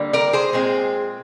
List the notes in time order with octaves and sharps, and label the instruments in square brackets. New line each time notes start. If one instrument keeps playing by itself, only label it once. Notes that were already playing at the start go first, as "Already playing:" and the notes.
Already playing: [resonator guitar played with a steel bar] D3 G3 A#3
A#4 D5
G#4 C5
A#2 G#3 C4